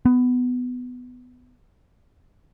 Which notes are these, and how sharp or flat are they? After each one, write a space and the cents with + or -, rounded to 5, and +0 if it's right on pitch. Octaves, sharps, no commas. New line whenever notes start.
B3 +15